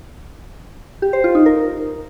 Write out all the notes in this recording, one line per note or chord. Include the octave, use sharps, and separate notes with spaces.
G4
C5
F4
D#4
A#4